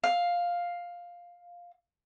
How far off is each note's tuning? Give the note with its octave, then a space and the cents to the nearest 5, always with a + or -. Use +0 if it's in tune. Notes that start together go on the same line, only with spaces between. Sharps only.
F5 +5